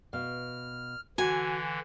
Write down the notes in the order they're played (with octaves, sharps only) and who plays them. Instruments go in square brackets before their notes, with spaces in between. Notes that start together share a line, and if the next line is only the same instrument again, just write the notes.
[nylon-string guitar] B2 F5 [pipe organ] F6
[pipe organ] D3 E3 [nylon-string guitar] F#4 [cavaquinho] G#5